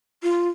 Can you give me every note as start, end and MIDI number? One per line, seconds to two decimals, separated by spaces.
0.23 0.48 65